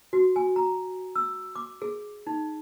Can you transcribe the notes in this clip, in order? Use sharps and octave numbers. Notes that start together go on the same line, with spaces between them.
F#4
G#5
A#5
E6
D6
G#4
D#4